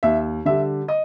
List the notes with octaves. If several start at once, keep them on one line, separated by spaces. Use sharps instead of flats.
D#2 E5
D3 G3 E5
D#5